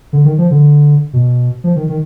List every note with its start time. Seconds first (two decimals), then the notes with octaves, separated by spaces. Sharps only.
0.13 D3
0.25 D#3
0.38 F3
0.51 D3
1.13 B2
1.64 F3
1.76 D#3
1.89 D#3